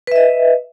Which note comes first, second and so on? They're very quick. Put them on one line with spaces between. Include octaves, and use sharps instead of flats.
B4 E5 D#5